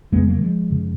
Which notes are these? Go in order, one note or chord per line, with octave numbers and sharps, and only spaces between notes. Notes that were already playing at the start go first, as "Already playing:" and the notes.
F2 C#3 G#3 B3
F#3 A#3
F3 G#3
F#2 C#3